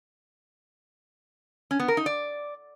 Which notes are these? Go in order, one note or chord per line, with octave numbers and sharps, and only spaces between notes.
C#4
B3
A#4
D#4
D5